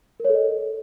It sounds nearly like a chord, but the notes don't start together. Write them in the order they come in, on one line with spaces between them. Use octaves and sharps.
A#4 C#5 A4 D#5